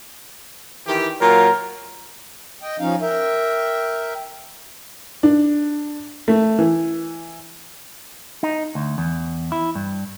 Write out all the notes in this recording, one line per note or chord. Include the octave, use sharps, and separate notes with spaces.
D#3 E3 G4
A#2 F#3 F4 A#4
D#5 G5
F3 C#4 D#4 F5
A#4 E5 G5
D4
A3
E3
D#4
D2
E2
E4
G2